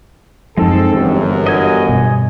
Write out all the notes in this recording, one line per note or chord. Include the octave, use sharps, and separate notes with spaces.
F#2 F3 G#3 C4 D#4 A4
G1 F#2 E3 F#3
D#5 G#5
G2 B2